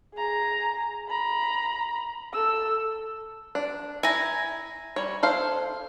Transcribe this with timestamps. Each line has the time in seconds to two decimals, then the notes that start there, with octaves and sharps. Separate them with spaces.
0.14 G#4 A#5
1.09 A#5 B5
2.33 A4 E6
3.55 D4
4.03 E4 G#5 A#5
4.96 G3 C#5
5.23 A4 C5 F5